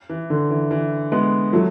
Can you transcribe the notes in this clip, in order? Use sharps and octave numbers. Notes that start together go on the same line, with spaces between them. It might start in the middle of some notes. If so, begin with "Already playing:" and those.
E3
D3
E3
E3
G#3 B3
F#3 A3